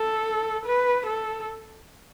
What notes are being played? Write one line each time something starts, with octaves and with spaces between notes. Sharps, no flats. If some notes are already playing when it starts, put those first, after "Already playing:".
Already playing: A4
B4
A4